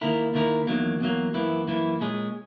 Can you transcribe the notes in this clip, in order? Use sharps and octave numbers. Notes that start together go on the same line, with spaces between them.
D#2 D#3 A#3 E4 A#4
D#2 D#3 A#3 E4 A#4
E2 D#3 F#3 A#3
E2 D#3 F#3 A#3
F#2 E3 A#3 E4
F#2 E3 A#3 E4
A#2 G#3 C#4 G#4